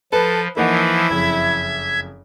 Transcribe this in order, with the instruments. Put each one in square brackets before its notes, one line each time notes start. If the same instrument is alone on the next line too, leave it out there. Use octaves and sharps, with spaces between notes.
[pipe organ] F3 [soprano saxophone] A4 [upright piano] B4
[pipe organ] E3 F3 [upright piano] A#3 D#4 F#5 [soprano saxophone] E4
[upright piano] F#1 F2 [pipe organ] E5 G#6